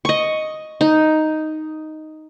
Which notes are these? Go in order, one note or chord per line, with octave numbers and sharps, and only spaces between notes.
D#5 C#6
D#4